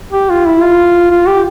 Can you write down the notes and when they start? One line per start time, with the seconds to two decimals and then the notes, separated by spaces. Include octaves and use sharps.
0.13 G4
0.30 F4
0.46 E4
0.62 F4
1.10 F4
1.27 G4